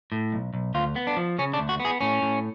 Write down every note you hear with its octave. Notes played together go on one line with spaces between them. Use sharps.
A2
B1
B1
D2 F4
B3
D4
F3
C#3 C#4
D4
D2
F#4
B3
G#4
A2 C#4
A2